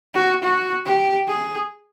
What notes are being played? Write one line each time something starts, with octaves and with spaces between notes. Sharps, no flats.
F#4
F#4
G4
G#4